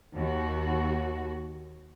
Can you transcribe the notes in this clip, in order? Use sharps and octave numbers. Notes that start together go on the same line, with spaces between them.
D#2 F#4